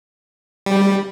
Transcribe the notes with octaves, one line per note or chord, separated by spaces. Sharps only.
G3